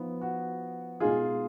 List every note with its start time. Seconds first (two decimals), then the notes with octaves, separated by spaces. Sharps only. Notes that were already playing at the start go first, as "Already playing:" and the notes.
Already playing: F3 B3 D#4
0.21 F#4
1.00 B2 G#3 D#4 F4 G#4